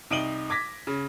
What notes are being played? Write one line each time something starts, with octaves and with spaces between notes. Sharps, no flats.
C2 D#4 D7 D#7 F#7 G7
D6 G#6 A#6 B6
C#3